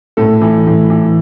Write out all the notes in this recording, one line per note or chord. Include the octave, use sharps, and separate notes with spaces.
A2 A4
E3
A2
E3